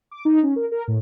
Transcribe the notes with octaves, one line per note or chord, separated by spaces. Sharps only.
D6
D#4
C#4
A#4
A#4
A2